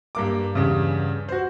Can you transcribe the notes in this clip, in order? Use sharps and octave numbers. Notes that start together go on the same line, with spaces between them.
G2 A#3 D6
E2 G2 C#3
F#4 C5